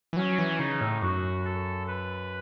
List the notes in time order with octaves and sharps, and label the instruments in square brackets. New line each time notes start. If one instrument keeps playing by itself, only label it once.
[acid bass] E3
[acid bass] F#3 [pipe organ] C#4
[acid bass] E3
[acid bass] C#3 [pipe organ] D#4
[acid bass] A2
[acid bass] F#2 [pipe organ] F#4
[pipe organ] A4
B4